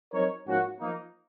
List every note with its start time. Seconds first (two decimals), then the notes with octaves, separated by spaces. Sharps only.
0.13 F#3 C4 D#4 A#4 C#5
0.47 G#2 F3 A#3 C#4 F#4
0.79 F3 A#3 D#4